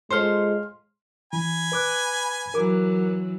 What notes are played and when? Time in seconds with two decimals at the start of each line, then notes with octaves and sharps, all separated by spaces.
0.11 G#3 F4 A4 C5 C6 F6
1.33 E3 G#5 B5
1.72 B4 D6 F#6
2.54 E3 F#3 A#4 D6